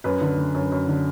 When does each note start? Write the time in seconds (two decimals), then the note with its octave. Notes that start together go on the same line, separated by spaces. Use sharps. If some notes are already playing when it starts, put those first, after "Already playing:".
0.04 F#2 B4
0.21 D3
0.37 D3
0.54 F#2
0.72 F#2
0.88 D3